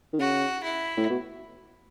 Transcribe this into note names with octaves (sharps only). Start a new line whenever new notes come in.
D#3
C#3 F#4
E4
A2
B2